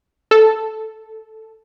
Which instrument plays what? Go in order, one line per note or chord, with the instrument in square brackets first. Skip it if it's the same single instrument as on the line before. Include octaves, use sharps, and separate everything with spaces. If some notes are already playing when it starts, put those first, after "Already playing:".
[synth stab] A4